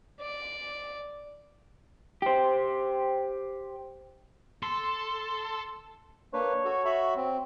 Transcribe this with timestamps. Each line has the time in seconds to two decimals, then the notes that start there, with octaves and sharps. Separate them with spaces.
0.21 D5
2.22 G4 C5
4.63 A4 C6
6.33 A#3 D4 B4 C#5
6.65 F#4 A4
6.85 F#4 E5 B5
7.16 C4